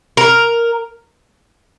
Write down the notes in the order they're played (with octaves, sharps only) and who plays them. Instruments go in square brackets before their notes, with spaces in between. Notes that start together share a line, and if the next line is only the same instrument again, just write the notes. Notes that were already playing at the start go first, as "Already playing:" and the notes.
[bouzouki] A#4